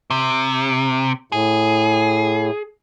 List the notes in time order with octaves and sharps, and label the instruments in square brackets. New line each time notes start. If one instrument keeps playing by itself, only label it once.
[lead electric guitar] C3
[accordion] A2 [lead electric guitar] G#4